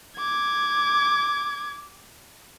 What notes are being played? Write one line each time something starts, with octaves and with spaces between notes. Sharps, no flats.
D6 G#6